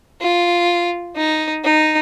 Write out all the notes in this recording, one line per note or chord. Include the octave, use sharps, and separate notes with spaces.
F4
D#4
D#4